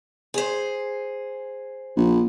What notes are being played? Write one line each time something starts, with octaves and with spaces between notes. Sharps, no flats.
G#4 C5
A#1